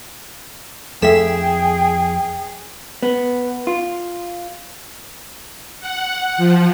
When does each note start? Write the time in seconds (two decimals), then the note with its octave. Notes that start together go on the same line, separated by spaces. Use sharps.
1.02 F2 A3 G#4 E5 G5 B6 E7
3.02 B3
3.67 F4
5.80 F#5
6.37 F3